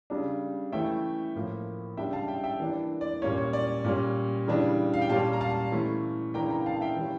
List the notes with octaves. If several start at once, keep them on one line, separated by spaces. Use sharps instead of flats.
C#3 G3 D4
E3 A3 C#4 E5 G5
A2 F3 A#3
C#3 G3 D4 E5 G5
F5 A5
E5 G5
E5 G5
E3 A#3 D4
D5
A#2 G3 A#3 C#4 C#5
C#5
D5
A#2 G3 C#4
C#3 E3 G3 D4
F5
G5
A#2 G3 C#4 F5 A5
A#5
F5 A5
E3 A3 C#4
C#3 E3 A#3 D4 G5 A#5
G5 A#5
F5 A5
F5
E5 G5
E3 G3 C#4